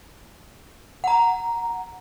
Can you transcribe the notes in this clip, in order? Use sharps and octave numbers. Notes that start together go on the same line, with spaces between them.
F#5 A#5